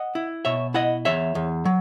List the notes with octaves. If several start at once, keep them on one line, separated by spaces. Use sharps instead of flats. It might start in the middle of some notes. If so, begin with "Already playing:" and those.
Already playing: D#5 F#5
E4
B2 C#5 E5
E4 D#5 F#5
E2 C#5 E5
E2
F#3